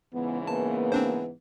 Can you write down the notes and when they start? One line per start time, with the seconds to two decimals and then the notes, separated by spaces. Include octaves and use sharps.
0.14 G#2 C#3 E3 B3
0.47 A#3 B3 A5
0.92 C4 D4 C5